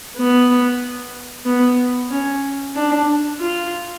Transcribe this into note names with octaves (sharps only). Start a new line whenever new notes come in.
B3
B3
C#4
D4
F4